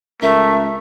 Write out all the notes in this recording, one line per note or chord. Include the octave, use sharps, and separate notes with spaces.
C#2 A3 A#4 E5